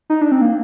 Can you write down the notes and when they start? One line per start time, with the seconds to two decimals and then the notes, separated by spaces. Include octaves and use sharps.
0.10 D#4
0.21 D4
0.32 C4
0.42 A#3